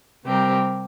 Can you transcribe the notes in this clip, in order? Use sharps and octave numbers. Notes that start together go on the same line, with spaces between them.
C3 G3 C4 G4 A#4